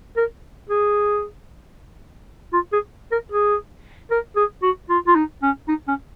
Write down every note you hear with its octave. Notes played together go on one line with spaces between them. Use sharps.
A#4
G#4
F4
G#4
A#4
G#4
A#4
G#4
F#4
F4
F4
D#4
C#4
D#4
C#4